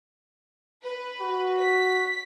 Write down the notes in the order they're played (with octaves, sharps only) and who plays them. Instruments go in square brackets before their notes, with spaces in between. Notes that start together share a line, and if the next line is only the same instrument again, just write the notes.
[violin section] B4
[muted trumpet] F#4
[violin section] B6